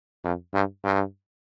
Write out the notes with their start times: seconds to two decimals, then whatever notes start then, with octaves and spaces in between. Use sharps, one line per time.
0.24 F2
0.53 G2
0.84 G2